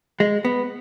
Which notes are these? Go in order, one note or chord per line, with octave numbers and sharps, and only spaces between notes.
G#3
B3